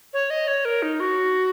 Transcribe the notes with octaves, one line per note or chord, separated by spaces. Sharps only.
C#5
D#5
C#5
A#4
D#4
F#4